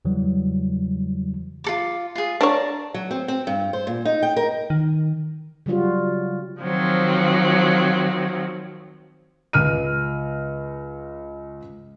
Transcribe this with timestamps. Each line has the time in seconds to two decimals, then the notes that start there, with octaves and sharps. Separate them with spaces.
0.05 E2 C#3 E3 F#3 G3
1.64 F4 A4 D6
2.15 F4 G#4
2.41 D4 C#5 D5 A5 A#5
2.94 F#3
3.11 C4
3.28 C4
3.47 G2
3.73 C5
3.87 A#2
4.05 D#4
4.23 G5
4.37 A#4
4.70 D#3
5.66 C#3 F#3 G3 F4 F#4
6.61 D#3 F3 F#3 C4
9.53 C#2 F6 D#7